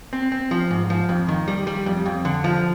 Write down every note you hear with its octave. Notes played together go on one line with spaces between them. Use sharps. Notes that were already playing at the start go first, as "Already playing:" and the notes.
C4
C4
F3
G#2
F3
F2
D#3
G3
G3
F2
F2
D3
F3